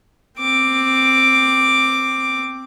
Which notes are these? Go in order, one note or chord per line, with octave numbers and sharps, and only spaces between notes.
C4 D6